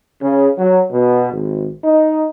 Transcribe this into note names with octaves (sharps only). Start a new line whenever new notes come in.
C#3
F#3
B2
G#1
D#4